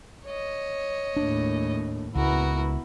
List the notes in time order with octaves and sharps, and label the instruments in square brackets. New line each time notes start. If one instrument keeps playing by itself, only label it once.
[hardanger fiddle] C#5 D#5
[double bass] D#2 A2 [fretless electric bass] D4
[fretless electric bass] C#2 [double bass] B3 E4 [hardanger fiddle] F#4 A#4